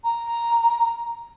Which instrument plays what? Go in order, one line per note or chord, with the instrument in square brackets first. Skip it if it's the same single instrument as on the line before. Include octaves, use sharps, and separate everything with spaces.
[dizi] A#5